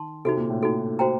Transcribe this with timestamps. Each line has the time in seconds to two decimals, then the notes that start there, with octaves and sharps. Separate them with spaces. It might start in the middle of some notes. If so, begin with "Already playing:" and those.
Already playing: D#3 A5 C6
0.25 C3 D#4 F#4 A4
0.37 A#2
0.50 A2
0.62 D#4 F#4 A4
0.99 F#4 C5 G5 A#5